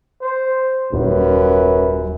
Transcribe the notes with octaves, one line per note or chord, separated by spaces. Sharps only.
C5
D#1 F#2 B4